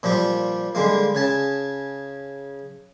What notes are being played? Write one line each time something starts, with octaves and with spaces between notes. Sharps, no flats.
A#2 F3 G3 G4
D3 G3 G#3 A#3
C#3 G#5 A5